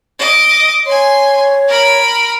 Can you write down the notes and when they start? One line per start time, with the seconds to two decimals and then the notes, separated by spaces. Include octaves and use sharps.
0.19 D#5 D6
0.86 C#5 G#5 C6
1.68 A#4 B5